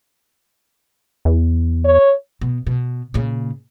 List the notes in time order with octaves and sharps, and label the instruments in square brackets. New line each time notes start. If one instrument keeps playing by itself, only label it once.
[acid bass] E2
[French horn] C#5
[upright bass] B2
B2
A#2 C#3